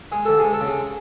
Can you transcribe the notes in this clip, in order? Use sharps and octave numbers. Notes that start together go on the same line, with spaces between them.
G#3 G#4
D2 A4
G#3 G#4
A4
C#3
G#4